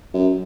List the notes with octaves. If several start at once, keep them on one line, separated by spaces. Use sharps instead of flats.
F#2